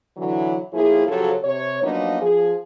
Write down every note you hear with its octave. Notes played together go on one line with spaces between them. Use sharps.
D3 E3 F#3
A2 F3 A#3 E4 G#4
C#3 F3 F#3 G4 A4 C#5
C3 C#5
F3 F#3 A#3 B3 D4 D#4
F3 G#4